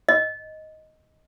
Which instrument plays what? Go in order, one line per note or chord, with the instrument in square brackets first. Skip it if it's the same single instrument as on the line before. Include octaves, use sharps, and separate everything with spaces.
[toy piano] D#5